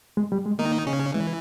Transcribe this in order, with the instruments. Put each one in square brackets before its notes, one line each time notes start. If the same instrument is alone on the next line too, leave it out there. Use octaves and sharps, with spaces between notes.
[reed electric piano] G#3
G3
G#3
[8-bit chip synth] D#3 D#4 [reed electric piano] A#3
[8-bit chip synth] C#3 C#4
[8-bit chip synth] E3 [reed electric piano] G#3